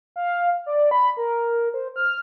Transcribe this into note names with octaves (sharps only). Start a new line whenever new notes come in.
F5
D5
B5
A#4
C5
F6